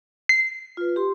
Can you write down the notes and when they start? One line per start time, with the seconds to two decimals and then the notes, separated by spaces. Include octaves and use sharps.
0.29 C7
0.77 F4 B4
0.96 G4 C6